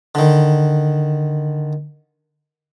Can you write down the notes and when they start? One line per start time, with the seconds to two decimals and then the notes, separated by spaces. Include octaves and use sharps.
0.15 D3 D#3